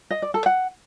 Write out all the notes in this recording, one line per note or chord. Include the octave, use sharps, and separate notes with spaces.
D#5
D5
A4
F#5